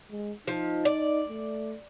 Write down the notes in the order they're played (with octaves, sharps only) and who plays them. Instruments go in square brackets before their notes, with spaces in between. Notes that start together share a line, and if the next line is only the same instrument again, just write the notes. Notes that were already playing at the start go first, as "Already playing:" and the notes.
[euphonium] G#3
[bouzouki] F3 [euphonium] D#4
[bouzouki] D5
[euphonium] A3